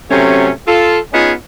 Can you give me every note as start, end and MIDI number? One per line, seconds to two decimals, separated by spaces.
0.10 0.50 48
0.10 0.50 54
0.10 0.50 57
0.10 0.50 61
0.66 0.98 65
0.66 0.98 69
1.12 1.33 59
1.12 1.33 61
1.12 1.33 63
1.12 1.33 65
1.12 1.33 68